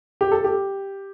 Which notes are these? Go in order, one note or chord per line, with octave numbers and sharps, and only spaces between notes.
G4
A4
G4